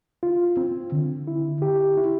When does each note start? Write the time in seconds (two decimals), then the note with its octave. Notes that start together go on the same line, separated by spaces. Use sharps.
0.23 F4
0.57 C4
0.92 D3
1.27 E4
1.62 G4
1.98 E4